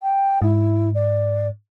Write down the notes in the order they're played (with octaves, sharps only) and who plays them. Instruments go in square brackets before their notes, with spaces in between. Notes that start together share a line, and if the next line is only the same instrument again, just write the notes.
[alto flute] G5
[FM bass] G#2 [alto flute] E4
[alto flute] D5